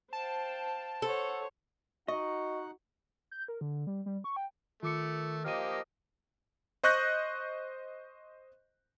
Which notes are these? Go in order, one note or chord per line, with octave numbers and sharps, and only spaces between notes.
C5 F5 G5 A5
A4 C5 C#5 F#5
D#4 F#4 D#5 F#5 C#6
G6
A#4
D3
G3
G3
C#6
G5
D#3 A3 F4 D6 C#7
F3 A#3 G4 D#5 F6 D#7
C5 D#5 C#6 F#6 G6 A#6